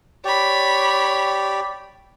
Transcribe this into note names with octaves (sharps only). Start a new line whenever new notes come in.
G4 C#5 D5 B5